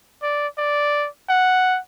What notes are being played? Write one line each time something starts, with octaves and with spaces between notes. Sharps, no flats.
D5
D5
F#5